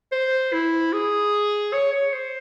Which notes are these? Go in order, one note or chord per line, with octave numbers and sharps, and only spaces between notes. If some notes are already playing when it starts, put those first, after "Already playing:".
C5
E4
G#4
C#5
C#5
C5